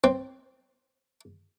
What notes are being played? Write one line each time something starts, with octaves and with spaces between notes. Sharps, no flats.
C4